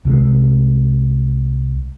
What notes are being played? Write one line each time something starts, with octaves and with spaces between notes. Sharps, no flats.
C2 C3 F3 G#3